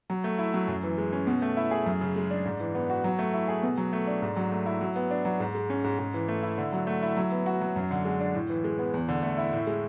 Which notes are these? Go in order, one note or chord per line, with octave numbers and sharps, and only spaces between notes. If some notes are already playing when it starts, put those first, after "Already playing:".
F#3
A3
E4
F#3
F#2
E3
G#3
C#4
B2
A3
E4
G#4
F#2
C#3
G#3
D4
G#2
E3
B3
F#4
F#3
A3
E4
G#4
B2
F#3
A3
D4
G#2
F#3
A3
E4
F#3
B3
D4
F#3
G#2
G#3
C#4
G#2
G#2
E3
A3
E4
D3
F#3
A3
E4
F#3
B3
F#4
F#3
F#2
D3
G#3
D4
A2
E3
G#3
B3
E2
D3
A3
E4
A2
G#3